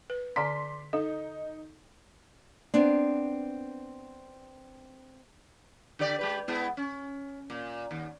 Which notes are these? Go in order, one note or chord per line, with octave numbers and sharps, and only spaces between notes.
B4
D3 D5 A#5 C6 B6
D#4 A4
B3 C4 D4
D3 G4 D5
G#3 G4 B4
G#3 B3 E4
C#4
A#2
D#2